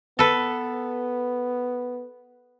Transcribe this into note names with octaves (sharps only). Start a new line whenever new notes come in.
B3 A4 B4